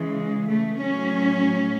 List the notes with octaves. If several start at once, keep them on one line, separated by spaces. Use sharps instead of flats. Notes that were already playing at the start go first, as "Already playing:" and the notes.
Already playing: C#3 E3 G#3
A3
A2 F#3 C#4